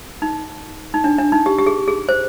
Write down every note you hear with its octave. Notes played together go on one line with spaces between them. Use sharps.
D#4
D#4
D4
D4
D#4
G4
G4
G#4
G#4
C5